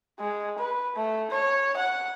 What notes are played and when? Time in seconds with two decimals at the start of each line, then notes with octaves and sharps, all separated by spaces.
0.19 G#3
0.58 B4
0.96 A3
1.31 C#5
1.76 F#5